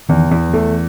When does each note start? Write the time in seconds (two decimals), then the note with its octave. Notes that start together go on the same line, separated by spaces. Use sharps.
0.09 E2 D#3
0.31 E2 E3
0.53 E3 A3